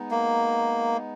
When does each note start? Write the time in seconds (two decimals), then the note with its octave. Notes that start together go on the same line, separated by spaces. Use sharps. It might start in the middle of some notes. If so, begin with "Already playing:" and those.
Already playing: G#3 B3 D#4
0.11 A#3